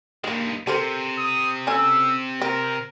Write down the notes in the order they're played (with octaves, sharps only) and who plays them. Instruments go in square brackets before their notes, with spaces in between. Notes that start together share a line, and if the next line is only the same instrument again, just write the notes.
[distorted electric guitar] G2 G#3 [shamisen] D#3 A#3
[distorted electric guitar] C3 [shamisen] A4 A#4 C5
[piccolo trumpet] D#6
[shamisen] C#4 A4 G#5 [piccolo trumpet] E6
[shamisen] C4 [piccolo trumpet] A#4